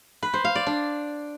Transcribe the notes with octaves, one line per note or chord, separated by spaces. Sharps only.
B4
C5
F5
D5
D4